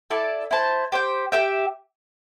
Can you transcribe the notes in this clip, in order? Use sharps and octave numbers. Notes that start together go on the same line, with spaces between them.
E4 A4 D5 A5
E4 C5 A5
G4 C5 G5
G4 E5 G5